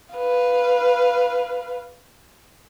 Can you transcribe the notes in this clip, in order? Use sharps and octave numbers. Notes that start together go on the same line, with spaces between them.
B4 F5